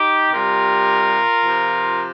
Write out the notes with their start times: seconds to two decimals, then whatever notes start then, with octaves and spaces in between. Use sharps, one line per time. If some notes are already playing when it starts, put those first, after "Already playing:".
Already playing: D#4 G4
0.32 C3 G3 F4 A#4
1.41 C3 F3